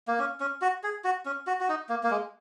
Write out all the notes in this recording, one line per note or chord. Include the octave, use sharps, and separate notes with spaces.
A#3
C#4
C#4
F#4
G#4
F#4
C#4
F#4
F#4
D#4
A#3
A#3
G#3